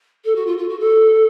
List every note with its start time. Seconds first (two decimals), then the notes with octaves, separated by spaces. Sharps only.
0.25 A4
0.35 F#4
0.46 F4
0.58 F4
0.69 F#4
0.80 A4